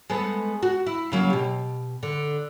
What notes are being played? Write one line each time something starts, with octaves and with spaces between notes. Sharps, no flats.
G#3 A3 B3
F#4
E4
C#3 F#3 A#3
B2 G4
D3